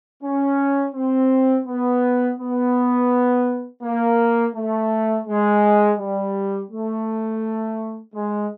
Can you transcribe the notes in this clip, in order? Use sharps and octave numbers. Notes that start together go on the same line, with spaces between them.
C#4
C4
B3
B3
A#3
A3
G#3
G3
A3
G#3